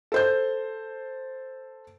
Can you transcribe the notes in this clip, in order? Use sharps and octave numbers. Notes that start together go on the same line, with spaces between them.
A4 C5 G6